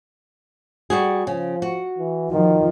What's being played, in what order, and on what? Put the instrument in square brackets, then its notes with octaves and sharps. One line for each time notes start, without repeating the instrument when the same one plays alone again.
[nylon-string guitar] G3 F#4 G#4
[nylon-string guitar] C#3 [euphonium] F3
[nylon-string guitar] F#4
[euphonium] E3
[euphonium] D#3 [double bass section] F3